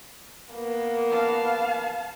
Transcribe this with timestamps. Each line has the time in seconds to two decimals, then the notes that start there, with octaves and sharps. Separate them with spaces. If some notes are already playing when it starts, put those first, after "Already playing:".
0.53 A#3 B3
1.11 F5 A5